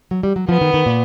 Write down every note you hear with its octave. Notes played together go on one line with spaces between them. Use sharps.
F#3
G3
F#3
F3 B3
D#3
D#3
A#2